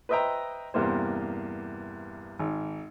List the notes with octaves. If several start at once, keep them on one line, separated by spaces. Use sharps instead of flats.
B4 C5 D#5 E5 G5 A#5
E2 G2 C3 A#3 C5
G#1